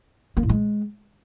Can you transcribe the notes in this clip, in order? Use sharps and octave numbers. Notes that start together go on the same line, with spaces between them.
A#3
A2
G#3